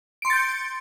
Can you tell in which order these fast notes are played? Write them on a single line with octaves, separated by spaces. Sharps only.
D7 C6 C#7 A6 G6